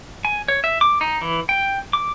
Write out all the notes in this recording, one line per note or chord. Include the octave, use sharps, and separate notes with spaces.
G#5
C#5
E5
D6
D#4
E3
G5
D6